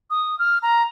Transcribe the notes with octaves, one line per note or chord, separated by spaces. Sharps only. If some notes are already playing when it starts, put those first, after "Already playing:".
D#6
F6
A#5